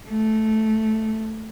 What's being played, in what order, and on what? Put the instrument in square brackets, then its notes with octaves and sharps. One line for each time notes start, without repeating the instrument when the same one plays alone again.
[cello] A3